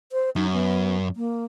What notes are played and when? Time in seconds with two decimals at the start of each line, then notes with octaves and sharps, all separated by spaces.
0.12 C5
0.36 F#2 D#4
0.52 B3
1.16 A#3